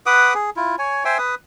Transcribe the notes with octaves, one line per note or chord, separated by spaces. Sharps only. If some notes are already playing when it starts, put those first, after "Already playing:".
B4 F#5 D6 D#6
G#4
E4 F4
C#5 G#5
C5 E5 G5 G#5
B4 D#6